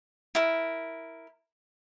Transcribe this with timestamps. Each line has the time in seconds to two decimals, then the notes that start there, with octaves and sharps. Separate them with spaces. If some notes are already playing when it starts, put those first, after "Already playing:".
0.35 E4 A#4